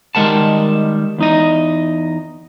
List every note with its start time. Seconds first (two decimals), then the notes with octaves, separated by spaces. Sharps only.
0.15 D#3 G3 G#3 A#4 F#5 A5
1.18 E2 D#4 D#5